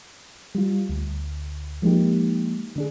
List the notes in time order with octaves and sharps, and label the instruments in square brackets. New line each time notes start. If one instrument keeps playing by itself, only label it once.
[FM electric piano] G3 F4
D2
F3 G#3 A#3 D#4 G4
D3 D4 G#4